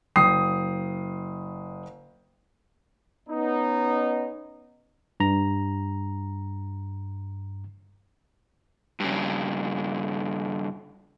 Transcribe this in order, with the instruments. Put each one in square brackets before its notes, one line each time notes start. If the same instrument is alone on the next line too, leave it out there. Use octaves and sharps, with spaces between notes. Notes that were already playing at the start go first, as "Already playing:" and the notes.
[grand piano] F#1 G5 D#6 C7
[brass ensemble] B3 C#4 D#4
[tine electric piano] G2 A#5
[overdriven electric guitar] G2 C#3